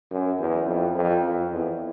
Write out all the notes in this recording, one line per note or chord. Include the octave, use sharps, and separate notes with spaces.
F#2
E2
F2
F2
F2
E2